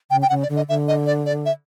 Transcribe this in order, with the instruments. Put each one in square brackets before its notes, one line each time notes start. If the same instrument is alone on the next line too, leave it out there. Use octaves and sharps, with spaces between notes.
[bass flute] C#3 [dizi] G5
[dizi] G5
[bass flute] C#3 [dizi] F#5
[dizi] D5
[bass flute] D3
[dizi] D#5
[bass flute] D3 [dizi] E5
[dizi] D#5
D5
D5
E5